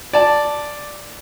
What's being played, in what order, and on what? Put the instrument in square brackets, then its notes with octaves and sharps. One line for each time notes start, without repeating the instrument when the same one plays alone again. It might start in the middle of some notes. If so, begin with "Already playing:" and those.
[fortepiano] D5 A5